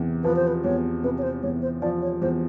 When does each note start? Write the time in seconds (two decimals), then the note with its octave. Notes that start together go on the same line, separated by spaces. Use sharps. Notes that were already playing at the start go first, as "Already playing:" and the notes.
Already playing: E2 C3
0.24 F3 B4
0.36 C5
0.47 B4
0.64 E2 C#5
1.03 C3 B4
1.18 C#5
1.23 C5
1.43 E2 C#5
1.62 C5
1.82 F3 D5
2.02 C#5
2.21 E2 C5